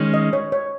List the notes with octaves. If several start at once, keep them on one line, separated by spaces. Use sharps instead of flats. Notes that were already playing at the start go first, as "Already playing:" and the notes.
Already playing: D#3 G#3 C#4
D#5
C#5
C#5